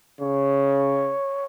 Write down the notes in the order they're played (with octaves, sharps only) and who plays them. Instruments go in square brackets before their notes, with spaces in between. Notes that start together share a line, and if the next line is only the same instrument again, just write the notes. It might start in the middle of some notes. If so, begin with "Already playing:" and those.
[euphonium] C#3 [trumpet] C#5